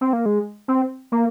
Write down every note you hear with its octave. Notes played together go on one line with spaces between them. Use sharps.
C4
A#3
G#3
C4
A#3